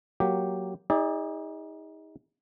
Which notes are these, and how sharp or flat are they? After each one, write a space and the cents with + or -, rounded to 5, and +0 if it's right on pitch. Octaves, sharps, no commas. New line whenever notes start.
F#3 +0 A#3 +0 G4 +0
D#4 +30 G#4 -40 D5 +0